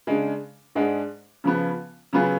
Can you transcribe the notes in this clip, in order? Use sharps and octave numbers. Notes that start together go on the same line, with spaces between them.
C#3 G#3 D4
G#2 G#3 D4
C#3 F3 B3
C#3 F#3 B3 F4 G#4